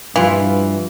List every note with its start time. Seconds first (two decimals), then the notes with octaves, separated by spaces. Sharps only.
0.16 G2 E3 F3 G3 E4 F4 F5